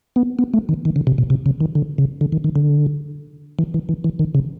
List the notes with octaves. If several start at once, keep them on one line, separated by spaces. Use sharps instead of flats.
B3
B3
A3
D#3
D#3
D3
C3
B2
C3
C#3
D#3
D3
C#3
D3
D#3
D#3
D3
E3
E3
E3
E3
D#3
C#3